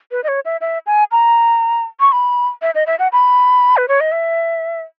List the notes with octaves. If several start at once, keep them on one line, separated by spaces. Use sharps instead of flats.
B4
D#5
C#5
E5
E5
G#5
A#5
C#6
B5
E5
D#5
E5
F#5
B5
B4
C#5
D#5
E5